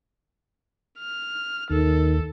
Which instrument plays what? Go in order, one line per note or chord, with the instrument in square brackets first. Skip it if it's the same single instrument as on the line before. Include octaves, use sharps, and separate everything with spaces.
[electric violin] F6
[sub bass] D#2 [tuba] D#3 [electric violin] A4